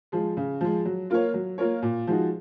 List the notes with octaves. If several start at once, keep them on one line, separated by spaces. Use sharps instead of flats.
F3 G#3
C#3
F3 G#3
F#3
A#3 F4 A#4 C#5
F#3
A#3 F4 A#4 C#5
A#2
F3 G#3 D#4 F#4